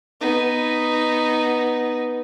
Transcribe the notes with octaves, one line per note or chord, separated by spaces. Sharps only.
B3 D#4